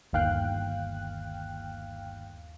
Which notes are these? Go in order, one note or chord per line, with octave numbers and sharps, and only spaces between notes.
G1 D#2 F5 G5 F#6